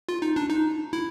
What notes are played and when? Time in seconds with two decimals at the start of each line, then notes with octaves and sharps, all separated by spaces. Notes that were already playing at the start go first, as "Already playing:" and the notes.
0.09 F4
0.22 D#4
0.36 D4
0.50 D#4
0.93 E4